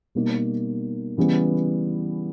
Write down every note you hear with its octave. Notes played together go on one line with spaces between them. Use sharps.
B2 G3 A#3 D#4
C#3 E3 G3 B3